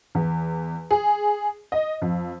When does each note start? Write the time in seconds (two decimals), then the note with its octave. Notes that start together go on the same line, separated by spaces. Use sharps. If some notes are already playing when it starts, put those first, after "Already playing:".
0.15 E2
0.91 G#4
1.72 D#5
2.02 F2